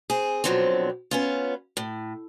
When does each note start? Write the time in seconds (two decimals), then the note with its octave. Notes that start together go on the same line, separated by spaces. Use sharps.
0.10 C4 G#4
0.44 B2 D3 F3 F#3 B3 C4
1.11 B3 C#4 F4
1.77 A2